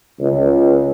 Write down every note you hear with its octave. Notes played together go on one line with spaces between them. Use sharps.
C#2